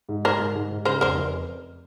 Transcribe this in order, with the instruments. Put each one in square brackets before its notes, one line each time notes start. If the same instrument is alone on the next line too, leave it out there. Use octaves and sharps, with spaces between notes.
[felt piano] G#2
[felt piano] G#2 [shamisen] A#4 C5
[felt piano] G#2
G#2
G#2
[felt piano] C#3 [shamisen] A#4 C5
[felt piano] F1 [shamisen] A#4 C5
[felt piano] F1